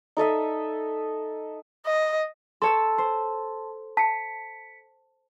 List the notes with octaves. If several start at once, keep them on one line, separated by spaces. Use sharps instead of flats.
D#4 A4 D#5 E5
D#5
A4 C#5 A5 C6 E6
C5
A5 B6 C#7